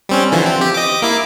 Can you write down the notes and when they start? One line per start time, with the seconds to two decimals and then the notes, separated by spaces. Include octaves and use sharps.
0.09 G3 C4 C#4
0.32 D3 E3 F3
0.46 C4
0.61 G4
0.74 D#5 D6
1.02 A#3 E4 D6